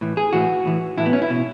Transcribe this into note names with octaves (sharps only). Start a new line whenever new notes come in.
A2 E3
G#4
A2 E3 F#4
A2 E3
A2 E3 E4
B3
C#4
E4
B2